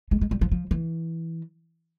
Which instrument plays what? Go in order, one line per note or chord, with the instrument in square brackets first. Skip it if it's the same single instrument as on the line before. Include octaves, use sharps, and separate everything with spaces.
[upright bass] G#3
G#3
G3
F3
F3
E3